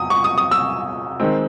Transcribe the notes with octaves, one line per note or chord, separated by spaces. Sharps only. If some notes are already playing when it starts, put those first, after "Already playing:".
Already playing: E2 C3 D#6
C#6
D#6
D#6
E6
D#3 G#3 C4